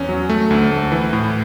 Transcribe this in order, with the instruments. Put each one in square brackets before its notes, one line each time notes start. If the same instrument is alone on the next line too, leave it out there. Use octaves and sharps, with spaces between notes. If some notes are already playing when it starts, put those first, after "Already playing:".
Already playing: [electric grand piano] E2 C#4
F#3
A3
D2
A3
E3
A2